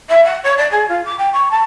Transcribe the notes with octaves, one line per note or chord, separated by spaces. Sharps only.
E5
F#5
C#5
D5
G#4
F4
D6
G5
C#6
A5